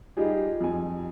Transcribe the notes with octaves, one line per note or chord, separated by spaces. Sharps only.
G3 D#4 F4 G4 G#4
F2 G#5